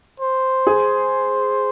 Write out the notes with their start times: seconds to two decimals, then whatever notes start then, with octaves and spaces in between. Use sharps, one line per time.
0.20 C5
0.67 G#4